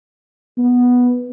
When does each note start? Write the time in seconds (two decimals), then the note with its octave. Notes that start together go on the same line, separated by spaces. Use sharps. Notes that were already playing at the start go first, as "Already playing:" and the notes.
0.58 B3